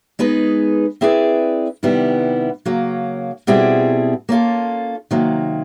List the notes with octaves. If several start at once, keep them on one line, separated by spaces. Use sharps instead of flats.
G#3 B3 D#4 G#4 B4
C4 E4 G#4 B4 D5
C3 D#3 G3 B3 E4
C#3 F#3 A#3
B2 G3 C4 E4 G#4
A#3 C#4 F4 A4
C3 D#3 F#3 A#3